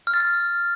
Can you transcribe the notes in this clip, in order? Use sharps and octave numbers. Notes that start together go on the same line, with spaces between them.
F6
A6
F6